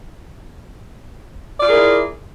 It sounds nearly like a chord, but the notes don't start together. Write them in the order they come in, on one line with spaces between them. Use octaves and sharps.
D5 F4 G#4 A#4 E4